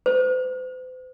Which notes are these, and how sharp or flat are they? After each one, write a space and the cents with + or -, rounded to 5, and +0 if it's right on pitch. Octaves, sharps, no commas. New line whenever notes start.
C5 -45